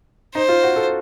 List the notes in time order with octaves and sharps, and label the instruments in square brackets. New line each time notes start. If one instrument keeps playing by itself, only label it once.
[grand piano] D#4 [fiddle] C5
[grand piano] F4
F#4
A4